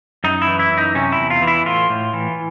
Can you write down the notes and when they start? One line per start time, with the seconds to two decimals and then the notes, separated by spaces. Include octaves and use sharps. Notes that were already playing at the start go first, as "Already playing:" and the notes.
0.24 F#2 D#4
0.42 E4
0.47 E3
0.59 E4
0.72 F#2
0.78 D#4
0.95 C3 C#4
1.12 E4
1.18 E2
1.30 F4
1.42 E3
1.47 E4
1.65 A2 F4
1.89 A2
2.13 E3